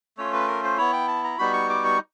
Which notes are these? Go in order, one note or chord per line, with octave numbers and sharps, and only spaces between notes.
A3 C#4 F4 C#5
B4
A#4
C5
B3 E4 C#5
G5
A5
A#5
G3 B3 D#4 F#4 B5
C#6
D6
C#6